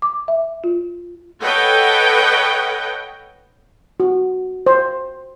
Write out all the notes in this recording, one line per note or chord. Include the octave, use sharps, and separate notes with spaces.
D6
E5
F4
A4 B4 C#5 D#5 F#5 G5
F#4
C5